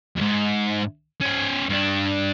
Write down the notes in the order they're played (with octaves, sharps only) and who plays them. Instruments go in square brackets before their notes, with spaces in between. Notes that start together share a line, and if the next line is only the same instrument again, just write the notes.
[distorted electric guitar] F2 G#2
C#4 C5
G2 D4